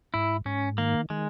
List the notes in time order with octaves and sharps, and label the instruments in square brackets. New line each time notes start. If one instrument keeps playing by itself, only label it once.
[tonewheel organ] G#2 [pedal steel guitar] E4
[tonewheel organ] G#2 [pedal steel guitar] C#4
[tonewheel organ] D#3 [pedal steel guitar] A#3
[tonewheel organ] D#3 [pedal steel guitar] G#3